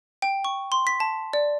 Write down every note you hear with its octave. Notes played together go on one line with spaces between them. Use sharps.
G5
C#6
C6
B6
A5
D5